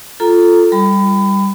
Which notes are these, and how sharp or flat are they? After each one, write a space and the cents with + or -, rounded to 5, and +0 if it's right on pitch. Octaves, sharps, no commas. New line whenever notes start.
F4 +0 A4 +0 A#5 +0
G3 +0 B5 +30